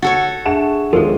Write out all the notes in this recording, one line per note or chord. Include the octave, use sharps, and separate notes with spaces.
F#4 A4 C#5 F#5 A6
D4 G#4 E5 F#5 A5 E7
D#2 F3 G#3 F4 A4